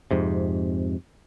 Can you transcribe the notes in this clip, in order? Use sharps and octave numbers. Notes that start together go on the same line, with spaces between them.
F2 G#2 C3